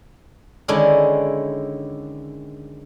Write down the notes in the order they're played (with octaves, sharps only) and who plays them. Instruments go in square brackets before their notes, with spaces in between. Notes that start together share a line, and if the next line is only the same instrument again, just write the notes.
[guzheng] D3 D#3 G#3 C#4 D4 E4